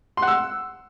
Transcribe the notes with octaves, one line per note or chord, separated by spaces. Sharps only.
F#5 C6 E6